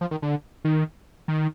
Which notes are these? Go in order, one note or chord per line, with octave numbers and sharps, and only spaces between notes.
F3
D#3
D3
D#3
D#3